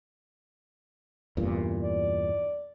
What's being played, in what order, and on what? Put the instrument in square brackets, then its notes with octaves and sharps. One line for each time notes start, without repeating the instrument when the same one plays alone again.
[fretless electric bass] E2 G2 A#2
[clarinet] D5